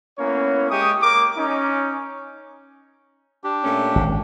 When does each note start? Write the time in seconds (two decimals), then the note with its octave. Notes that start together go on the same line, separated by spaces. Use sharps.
0.18 A#3 B3 C#4 E4 C#5
0.70 G#3 G4 C#6 D#6
1.02 A#3 D6
1.37 C#4 D#4
3.44 D4 G4
3.63 A#2 A3 C#4
3.96 G#1